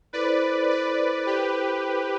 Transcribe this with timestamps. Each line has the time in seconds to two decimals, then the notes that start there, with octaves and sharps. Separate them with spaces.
0.13 E4 A4 B4 C5 D5
0.70 B4 D5
1.26 G4 B4